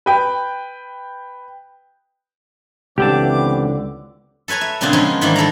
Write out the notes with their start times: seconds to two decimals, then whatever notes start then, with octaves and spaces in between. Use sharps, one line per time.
0.06 B4 G5
2.98 C#2 D3 E3 B3 C4 G4 A5 D6
4.48 A4 B4 C#5 G#5 A#5
4.61 E5
4.81 A#2 C#3 B3 C4 D4 G#4
4.93 F3 G#3 C#4 D#4 F4
5.21 G#2 D#3 E3 G3 A#3 D4
5.36 D#3 A4 D5 A#5